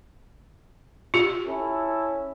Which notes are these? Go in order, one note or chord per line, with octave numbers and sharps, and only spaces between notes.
F4 G4
C#4 E4 A4